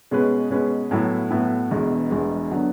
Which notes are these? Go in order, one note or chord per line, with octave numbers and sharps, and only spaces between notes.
B2 G#3 C#4 G#4 B4
B2 G#3 C#4 G#4 B4
A2 F#3 B3 E4
A2 F#3 B3 E4
E1 E2 B2 G#3
E1 E2 B2 G#3
D3 F#3 B3